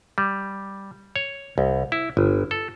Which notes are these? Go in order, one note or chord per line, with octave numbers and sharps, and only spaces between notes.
G3
C#5
C2
E4
G1
A4